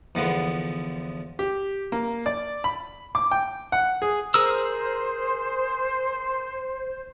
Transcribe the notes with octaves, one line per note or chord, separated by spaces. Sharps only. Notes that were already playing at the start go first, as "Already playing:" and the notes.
E2 D3 F3 B3
G4
A#3
D5
B5
D6
G5
F#5
G#4
G#4 A#4 C5 E6